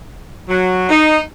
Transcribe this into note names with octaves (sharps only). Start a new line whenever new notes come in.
F#3
D#4